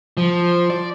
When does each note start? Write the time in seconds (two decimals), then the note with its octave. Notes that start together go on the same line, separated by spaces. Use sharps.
0.17 F3
0.70 D5